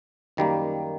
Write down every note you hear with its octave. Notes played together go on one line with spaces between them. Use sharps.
F#2 D#3 G3 A#3